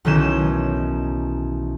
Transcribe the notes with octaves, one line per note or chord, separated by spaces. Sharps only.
B1 D#3 E3 C#4 G6 E7